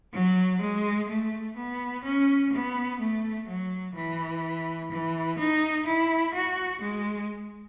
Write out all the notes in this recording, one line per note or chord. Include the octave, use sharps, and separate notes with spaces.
F#3
G#3
A3
B3
C#4
B3
A3
F#3
E3
E3
D#4
E4
F#4
G#3